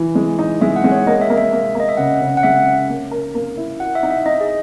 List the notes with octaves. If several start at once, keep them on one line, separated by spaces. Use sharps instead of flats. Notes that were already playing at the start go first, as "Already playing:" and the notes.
Already playing: E3
G#3
D#4
G#3 E5
F#5
G#3
C#5
A#3 D#5
E5
A#3
E5
A#3
A#3 D#5
E5
C#3 F#5
C#3
F#5
G#3 E5
C#4
A#3
A#4
A#3
E4
F#4 F#5
E5
D#4
E5
D#4 D#5
G#4